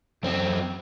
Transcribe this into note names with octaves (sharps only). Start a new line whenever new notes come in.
F#2 C4